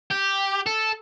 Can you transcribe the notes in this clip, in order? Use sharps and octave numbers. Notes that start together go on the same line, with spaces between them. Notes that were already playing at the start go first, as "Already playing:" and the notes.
G4
A4